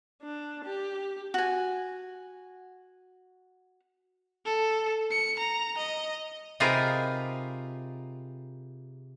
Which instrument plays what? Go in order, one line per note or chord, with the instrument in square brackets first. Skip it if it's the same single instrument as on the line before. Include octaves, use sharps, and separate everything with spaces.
[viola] D4
G4
[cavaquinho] F#4 G#5
[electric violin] A4
C#7
A#5
D#5
[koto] C3 D#4 F4 G#4 A#4 B4